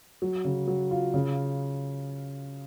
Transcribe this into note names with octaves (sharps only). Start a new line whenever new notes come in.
F#3
C#3
F#3
F4
C#3